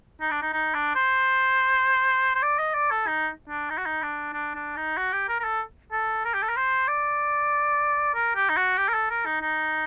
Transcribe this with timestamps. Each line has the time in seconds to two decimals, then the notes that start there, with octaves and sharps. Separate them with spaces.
0.21 D#4
0.31 D4
0.42 D#4
0.53 D#4
0.74 D4
0.95 C5
2.35 C5
2.42 D5
2.58 D#5
2.74 D5
2.91 A4
3.07 D#4
3.49 D4
3.70 D#4
3.78 F#4
3.86 D#4
4.02 D4
4.33 D4
4.54 D4
4.76 D#4
4.97 F#4
5.13 G4
5.29 A#4
5.40 A#4
5.44 A4
5.92 A4
6.25 A#4
6.34 G4
6.42 A4
6.49 A#4
6.56 C5
6.88 D5
8.14 A#4
8.35 G4
8.49 D#4
8.57 F#4
8.77 G4
8.89 A#4
8.93 A4
9.10 A#4
9.25 D#4
9.41 D#4